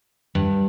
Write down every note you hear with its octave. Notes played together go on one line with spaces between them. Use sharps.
G2